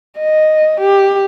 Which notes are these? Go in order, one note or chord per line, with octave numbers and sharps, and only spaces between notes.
D#5
G4